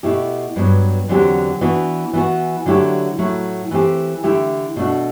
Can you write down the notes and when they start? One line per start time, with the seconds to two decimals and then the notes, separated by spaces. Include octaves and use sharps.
0.03 B2 A3 E4 G4
0.56 G2 F#3 B3
1.08 E2 D3 F#3 C4 G4
1.61 E3 B3 D4 F#4
2.13 E3 B3 F#4
2.66 D3 F#3 A3 E4 G4
3.18 A2 F#3 A3 E4
3.71 E3 A3 C4 G4
4.23 D3 A3 E4 G4
4.76 B2 A3 D4 F#4